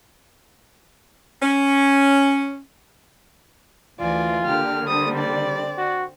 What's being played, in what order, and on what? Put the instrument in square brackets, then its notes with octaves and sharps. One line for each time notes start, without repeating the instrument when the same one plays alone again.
[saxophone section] C#4
[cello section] D2 E3 [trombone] F4 [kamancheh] D5 G#5
[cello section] D3 A#3 [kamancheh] G4 [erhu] F6
[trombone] G3 [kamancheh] C4 [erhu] D#6
[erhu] D5
[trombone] F#4